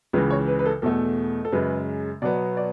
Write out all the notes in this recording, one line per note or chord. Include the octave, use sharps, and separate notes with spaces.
C#2 C#3 E3 B4
C#5
B4
B4
A4
E2 B2 A3 A4
A4
F#2 C#3 G#3 B4
B2 F#3 B3 D5
D5